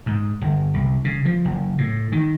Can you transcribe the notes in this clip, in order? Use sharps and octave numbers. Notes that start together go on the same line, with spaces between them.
G#2
G1
C2
C#3
F3
F#1
A2
D#3